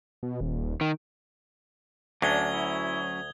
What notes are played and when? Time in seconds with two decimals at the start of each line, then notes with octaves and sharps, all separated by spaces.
0.23 B2
0.41 D#1
0.81 D#3
2.22 D2 F#3 C#4 D4 D#6 G#6 G7
2.53 E4